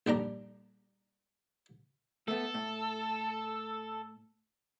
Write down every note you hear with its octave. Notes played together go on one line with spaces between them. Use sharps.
A#1 G3 D4 A#5
A3 B3 A4
A2